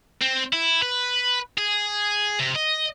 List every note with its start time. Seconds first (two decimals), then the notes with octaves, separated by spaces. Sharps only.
0.22 C4
0.53 E4
0.82 B4
1.58 G#4
2.39 C3
2.55 D#5